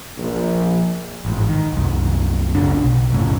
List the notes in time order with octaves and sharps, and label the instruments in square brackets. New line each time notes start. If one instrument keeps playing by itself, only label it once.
[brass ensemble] A#1
[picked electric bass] A1 G#2
D#3
C2 F#2
G1 C#2 C#3 D4
B1
F#2 A2 C#3